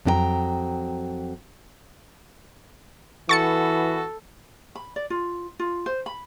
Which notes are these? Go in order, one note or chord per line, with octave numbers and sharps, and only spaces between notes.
F2 F#3 D4 G4 G5 A#5
E3 B3 F#4 A4 C#6 A6 C#7
B5
D5
F4
F4
C5
B5